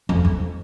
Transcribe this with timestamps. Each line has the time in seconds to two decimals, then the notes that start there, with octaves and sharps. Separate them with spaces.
0.09 F2
0.25 F2